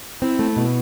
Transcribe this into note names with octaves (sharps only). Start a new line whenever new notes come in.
C4 E4
A3
B2